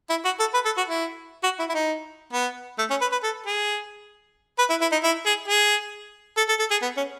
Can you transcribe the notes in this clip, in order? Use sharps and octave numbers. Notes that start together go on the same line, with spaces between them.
E4
F#4
A4
B4
A4
F#4
E4
F#4
E4
E4
D#4
B3
A3
C#4
B4
B4
A4
G#4
B4
E4
E4
D#4
E4
G#4
G#4
A4
A4
A4
G#4
B3
C#4